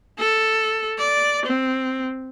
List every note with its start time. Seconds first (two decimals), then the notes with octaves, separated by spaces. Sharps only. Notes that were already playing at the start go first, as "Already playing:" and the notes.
0.19 A4
0.98 D5
1.46 C4